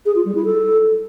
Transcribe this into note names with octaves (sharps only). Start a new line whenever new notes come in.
G#4
F4
G3
E4
A4